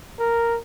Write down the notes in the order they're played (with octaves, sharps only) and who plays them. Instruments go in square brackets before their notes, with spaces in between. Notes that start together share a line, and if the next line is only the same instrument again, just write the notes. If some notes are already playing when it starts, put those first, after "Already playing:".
[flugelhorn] A#4